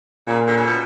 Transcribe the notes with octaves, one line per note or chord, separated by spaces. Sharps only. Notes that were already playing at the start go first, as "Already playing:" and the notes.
A#2 C#3
D3
C#3
B2